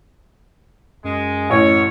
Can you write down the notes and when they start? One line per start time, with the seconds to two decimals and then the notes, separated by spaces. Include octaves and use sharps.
1.04 F#2 G#3
1.50 A1 C#5